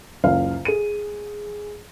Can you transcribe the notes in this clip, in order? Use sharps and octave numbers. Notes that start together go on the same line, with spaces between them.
F#1 C#2 F5
G#4 D#7